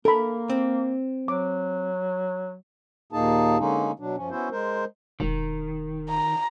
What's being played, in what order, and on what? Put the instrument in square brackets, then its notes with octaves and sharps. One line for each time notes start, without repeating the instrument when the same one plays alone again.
[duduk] A#3 [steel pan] A4 B5 [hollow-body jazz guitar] A#4
[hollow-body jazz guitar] C4
[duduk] F#3 [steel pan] D6
[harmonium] D#2 A#2 A#3 D#4 G#4 A5
D3 G#3 A#3 C#4 D#4
B2 F#3 D4
F#2 F3 C#4
B3 C#4 E4 F#4 C5
G#3 A#4 C5
[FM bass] E1 [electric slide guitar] D#3
[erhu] A#5